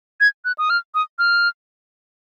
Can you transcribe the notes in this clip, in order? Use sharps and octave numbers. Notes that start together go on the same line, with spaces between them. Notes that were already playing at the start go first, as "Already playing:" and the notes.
G#6
F#6
D#6
F6
D#6
F6